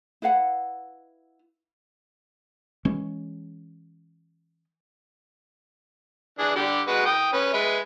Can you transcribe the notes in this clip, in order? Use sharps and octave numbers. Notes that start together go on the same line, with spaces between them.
E4 B4 F5 F#5
E3 G#3 C#4
E3 D4 G#4
D3 G3 G4
G#3 F#4 B4
G5 D#6
C#4 B4
G#3 B4 E5